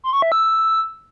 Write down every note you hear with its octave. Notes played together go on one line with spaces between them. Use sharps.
C6
C#6
E5
E6